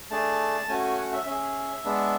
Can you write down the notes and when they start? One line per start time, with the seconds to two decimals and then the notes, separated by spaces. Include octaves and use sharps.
0.10 A3 D4 G#4 A5
0.69 A3 C#4 F#4 G#5
0.83 G#5
0.98 F#5
1.12 E5
1.26 C#4 G#4 E5
1.84 G#3 B3 D4